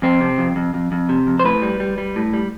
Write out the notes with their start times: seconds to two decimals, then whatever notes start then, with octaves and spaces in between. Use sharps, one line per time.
0.02 F2 C4
0.21 C3
0.38 F2
0.56 F2
0.74 F2
0.92 F2
1.09 C3
1.27 F2
1.39 C5
1.44 A2 B4
1.62 G3
1.80 G3
1.98 G3
2.16 A2
2.33 G3